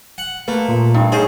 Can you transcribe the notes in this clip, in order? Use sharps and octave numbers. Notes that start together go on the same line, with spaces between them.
F#5
A3 A#3 B4
A#2
G2 D#4
G#2 G#4 C5 C#5